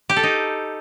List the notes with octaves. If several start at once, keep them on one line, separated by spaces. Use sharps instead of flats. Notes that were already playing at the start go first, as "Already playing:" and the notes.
G4
A4
D#4